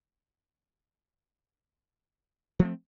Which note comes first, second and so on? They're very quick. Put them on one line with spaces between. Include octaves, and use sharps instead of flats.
F3 A3 C4